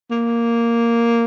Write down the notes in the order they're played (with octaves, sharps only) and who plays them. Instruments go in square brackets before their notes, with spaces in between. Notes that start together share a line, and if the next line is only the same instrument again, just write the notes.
[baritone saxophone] A#3